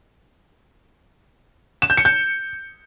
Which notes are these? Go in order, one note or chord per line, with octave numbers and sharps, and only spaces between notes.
E7
G6
C#7
G6